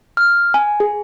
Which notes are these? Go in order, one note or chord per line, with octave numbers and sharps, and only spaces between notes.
F6
G#5
G#4